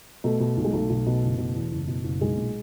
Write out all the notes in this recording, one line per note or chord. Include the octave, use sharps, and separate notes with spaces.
B2 A3
B2
B1
G#3
B1 A3
B1
B2
F#1
B2
E2
F#1
B2
F#1
B1 G#3
A#2